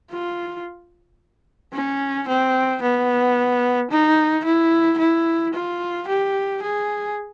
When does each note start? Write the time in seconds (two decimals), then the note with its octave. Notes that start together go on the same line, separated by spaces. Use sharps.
0.11 F4
1.74 C#4
2.28 C4
2.82 B3
3.91 D#4
4.45 E4
4.99 E4
5.54 F4
6.08 G4
6.62 G#4